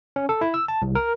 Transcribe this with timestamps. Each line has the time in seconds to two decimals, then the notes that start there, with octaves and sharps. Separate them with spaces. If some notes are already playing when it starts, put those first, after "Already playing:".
0.16 C#4
0.29 A4
0.41 E4
0.54 E6
0.68 A5
0.82 C2
0.95 A#4